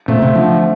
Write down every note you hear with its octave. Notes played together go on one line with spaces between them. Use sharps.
A#2 A3 C4
C3
D3 F3